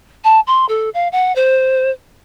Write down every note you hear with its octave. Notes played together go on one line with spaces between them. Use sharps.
A5
C6
A4
F5
F#5
C5